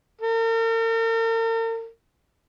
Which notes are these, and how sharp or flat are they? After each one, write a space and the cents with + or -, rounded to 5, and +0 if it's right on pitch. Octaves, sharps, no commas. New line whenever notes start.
A#4 -45